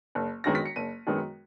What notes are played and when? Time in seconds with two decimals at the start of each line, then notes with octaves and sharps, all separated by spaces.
0.15 F#1
0.44 F#2 D#3 G#3 B3 A#6
0.55 B6
0.65 C#7
0.76 F#1 D#7
1.07 F#2 D#3 G#3 B3